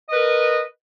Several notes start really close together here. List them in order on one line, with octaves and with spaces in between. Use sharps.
D#5 B4 A#4